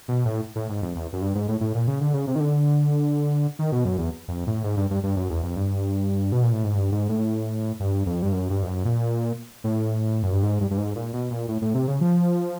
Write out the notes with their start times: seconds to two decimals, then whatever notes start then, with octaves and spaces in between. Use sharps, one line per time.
0.08 B2
0.25 A2
0.56 A2
0.69 G#2
0.82 F2
0.96 E2
1.13 F#2
1.22 G2
1.35 G#2
1.48 A2
1.61 A2
1.75 A#2
1.87 C#3
2.01 D3
2.14 C#3
2.27 C3
2.36 D#3
2.40 D3
3.59 D#3
3.72 B2
3.85 F#2
3.98 E2
4.28 F2
4.47 A2
4.64 G#2
4.77 G2
4.91 G2
5.03 G2
5.16 F#2
5.30 E2
5.43 F2
5.56 G2
6.32 B2
6.43 A#2
6.53 A2
6.64 G#2
6.75 G2
6.92 G#2
7.09 A2
7.80 G2
8.06 F2
8.22 G2
8.32 F#2
8.50 G2
8.63 F2
8.67 F#2
8.85 A#2
9.64 A2
10.23 F#2
10.33 G2
10.43 G#2
10.61 G2
10.71 G2
10.78 G#2
10.96 A#2
11.13 B2
11.30 A#2
11.48 A2
11.62 A2
11.74 C3
11.88 C#3
12.01 F3